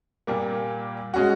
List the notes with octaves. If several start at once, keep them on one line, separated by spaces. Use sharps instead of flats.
A#2 G3 A#3
G#3 C#4 F#4